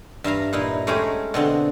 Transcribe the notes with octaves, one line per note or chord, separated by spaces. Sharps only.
G2 E5 F5 A#5
A#2 D#4 E4
G#3 A3 C#4 D#4 G4 G#4
B2 D3 C4 D4